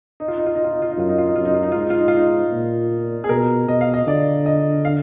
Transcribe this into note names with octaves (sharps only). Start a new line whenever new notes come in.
D#4
F4
D#4
F4
D#4
F4
D#4
F4
D#4
F#2 F4
D#4
F4
D#4
F#2 F4
D#4
F4
D#4
G#2 F4
D#4
F4
D#4
F4
D#4
A#2
G#4
B2 A#4
B2 D#5
F5
D#5
D3 D5
D#5
F5